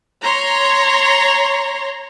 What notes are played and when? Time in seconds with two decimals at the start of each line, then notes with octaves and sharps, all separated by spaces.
0.23 C#5 A#5 C6